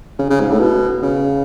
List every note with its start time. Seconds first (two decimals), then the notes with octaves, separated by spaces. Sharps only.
0.19 C#3
0.30 C#3
0.40 G#2
0.50 A2
0.60 B2
1.02 C#3